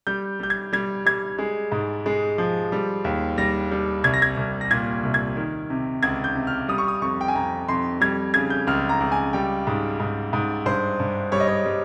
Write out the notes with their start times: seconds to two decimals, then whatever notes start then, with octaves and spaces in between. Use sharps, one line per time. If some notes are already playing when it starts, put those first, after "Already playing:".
0.07 G3 G6
0.40 G3 G6
0.50 G#6
0.73 G3 G#6
1.05 G3 G#6
1.38 G#3
1.72 G#2
2.06 G#3
2.38 F3
2.72 G3
3.04 D#2
3.38 G3 A#6
3.71 G3
4.04 C2 G#6
4.14 A#6
4.22 G#6
4.37 C2
4.61 A#6
4.70 A#2 G#6
5.03 C2
5.14 G#6
5.36 D#3
5.70 C3
6.03 C#2 G#6
6.24 G6
6.35 C3
6.47 F6
6.68 G3 D#6
6.78 C#6
6.88 D#6
7.02 F2 C#6
7.21 G5
7.28 G#5
7.35 F2 A#5
7.68 F2 C6
8.01 G3 G#6
8.34 C#3 G#6
8.50 G6
8.67 C#2 F6
8.89 A#5
9.00 C#2
9.12 G#5
9.33 G3 G5
9.67 G#2
10.00 G#2
10.33 G#2
10.66 G2 C5
11.00 G2
11.32 G3 C#5
11.40 D#5
11.48 C#5
11.65 G3